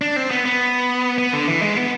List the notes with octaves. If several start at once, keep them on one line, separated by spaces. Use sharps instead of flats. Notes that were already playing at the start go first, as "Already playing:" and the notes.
D4
C4
B3
B3
B3
D3
E3
G#3
B3